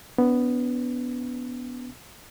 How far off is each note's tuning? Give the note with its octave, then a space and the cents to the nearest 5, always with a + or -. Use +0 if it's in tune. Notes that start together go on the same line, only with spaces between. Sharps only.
B3 +0 D4 -40